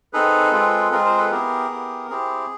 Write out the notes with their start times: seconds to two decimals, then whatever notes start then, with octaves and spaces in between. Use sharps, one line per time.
0.13 C4 D#4 G#4 A4 B4
0.52 G#3 C4 F4 G#4
0.92 G#3 C4 F4 G#4 A#4
1.05 A#4 C5
1.18 A4 B4
1.31 B3 E4 G4 G#4 A#4
1.71 B3 E4 G4
2.10 C4 E4 G4 G#4